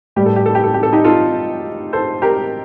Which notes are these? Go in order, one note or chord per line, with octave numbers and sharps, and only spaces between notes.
A2 G3 G4
A4
G4
A4
G4
A4
G4
A4
D#4 G4
F4 A4
A4 C5
G4 A#4